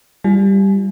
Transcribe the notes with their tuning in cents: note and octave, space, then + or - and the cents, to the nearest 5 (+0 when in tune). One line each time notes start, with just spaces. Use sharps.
G3 +0 F4 -40 G#5 +35